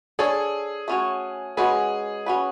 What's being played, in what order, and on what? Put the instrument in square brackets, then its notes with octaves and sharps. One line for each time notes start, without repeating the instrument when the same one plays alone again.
[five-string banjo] D4 A4 C#5 [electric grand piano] G#4
[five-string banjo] A3 C#4 F#4 C#5
[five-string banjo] G#3 C#4 F#4 B4 [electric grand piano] G#4
[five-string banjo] C#4 F#4 B4